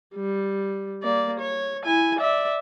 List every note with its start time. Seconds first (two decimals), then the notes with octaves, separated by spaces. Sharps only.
0.16 G3
1.03 A#3 D5
1.39 C#5
1.84 E4 G#5
2.19 D5 E5